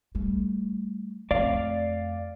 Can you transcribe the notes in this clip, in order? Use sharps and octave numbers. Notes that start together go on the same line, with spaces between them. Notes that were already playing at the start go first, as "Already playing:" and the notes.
G3 A3
F2 A3 D5 F5